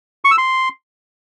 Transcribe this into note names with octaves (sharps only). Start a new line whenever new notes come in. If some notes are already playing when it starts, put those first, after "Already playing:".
C#6
E6
C6